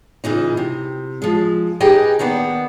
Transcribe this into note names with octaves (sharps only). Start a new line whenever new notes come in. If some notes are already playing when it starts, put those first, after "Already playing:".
A#2 C#3 E3 D#4
C3
F3 G#3
D#4 G4 G#4 B4 D#5 G5
D#3 A#3 B3 D4